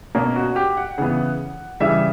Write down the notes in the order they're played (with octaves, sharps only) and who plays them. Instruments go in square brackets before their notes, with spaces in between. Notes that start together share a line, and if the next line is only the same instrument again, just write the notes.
[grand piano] B2 A#3 C#4
F#4
G4
F#5
C#3 E3 B3 F#5
C#3 E3 G3 E5